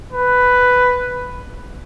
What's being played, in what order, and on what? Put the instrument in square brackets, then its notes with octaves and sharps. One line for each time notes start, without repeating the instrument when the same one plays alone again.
[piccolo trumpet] B4